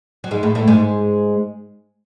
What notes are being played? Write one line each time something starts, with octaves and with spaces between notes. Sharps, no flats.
F#3
G#2 G#3
A2 A3
A2 A3
G#2 G#3